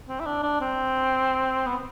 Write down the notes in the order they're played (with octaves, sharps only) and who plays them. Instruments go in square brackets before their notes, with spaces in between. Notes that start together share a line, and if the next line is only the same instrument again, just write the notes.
[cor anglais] C4
E4
D4
D4
C4
B3